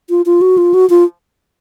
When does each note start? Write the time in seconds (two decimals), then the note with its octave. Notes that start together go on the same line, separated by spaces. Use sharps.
0.10 F4
0.26 F4
0.41 F#4
0.58 F4
0.74 F#4
0.90 F4